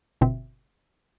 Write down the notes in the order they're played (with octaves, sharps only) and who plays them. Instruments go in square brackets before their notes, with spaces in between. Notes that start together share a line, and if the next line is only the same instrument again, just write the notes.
[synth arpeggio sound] G1 B2 C4 E5